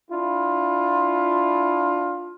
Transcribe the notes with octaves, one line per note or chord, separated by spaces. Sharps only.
D4 E4 F4